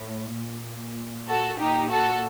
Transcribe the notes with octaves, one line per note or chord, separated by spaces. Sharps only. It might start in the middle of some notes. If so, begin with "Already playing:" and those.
Already playing: A2
A#2
F#4 A4
A#2 D#4 G4
F#4 A4